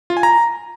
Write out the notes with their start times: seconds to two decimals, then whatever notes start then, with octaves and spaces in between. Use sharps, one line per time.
0.10 F4
0.17 G#5
0.23 A#5